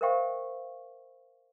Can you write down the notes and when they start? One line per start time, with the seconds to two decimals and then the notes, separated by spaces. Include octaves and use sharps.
0.01 A#4 C5 E5 F5 G5 C#6